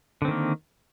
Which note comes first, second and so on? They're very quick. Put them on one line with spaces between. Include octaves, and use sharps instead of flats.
D3 C4 D#3 A#3